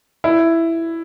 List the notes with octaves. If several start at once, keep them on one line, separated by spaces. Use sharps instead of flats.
E4